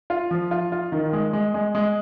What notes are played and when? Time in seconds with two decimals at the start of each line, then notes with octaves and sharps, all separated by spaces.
0.10 F4
0.31 F3
0.51 F4
0.72 F4
0.92 D#3
1.13 G#3
1.33 G#3
1.54 G#3
1.75 G#3